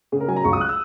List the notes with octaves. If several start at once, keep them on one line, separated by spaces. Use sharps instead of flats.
C#3 G#4
A#4
F#3 G#5
A#5
C#2 C#6
D#6
F#6
E6